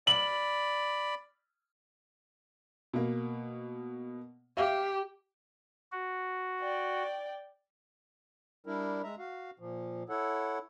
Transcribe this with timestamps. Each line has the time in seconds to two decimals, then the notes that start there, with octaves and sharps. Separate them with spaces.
0.07 D5 B5 F#7
2.93 B2 A#3
4.57 G4 E5 F5
5.92 F#4
6.61 D5 G5
8.66 G3 D4 E4 A#4
9.03 G#3 E5 A#5
9.19 F#4 F5
9.59 A#2 F3
10.09 E4 A4 C#5 F#5